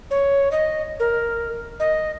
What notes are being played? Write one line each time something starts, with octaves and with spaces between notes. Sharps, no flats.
C#5
D#5
A#4
D#5